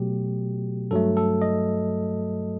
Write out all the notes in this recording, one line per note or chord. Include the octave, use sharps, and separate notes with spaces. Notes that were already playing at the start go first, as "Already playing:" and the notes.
Already playing: B2 F#3 A3 G4
G2 F#3 A3 A4
A4
D#5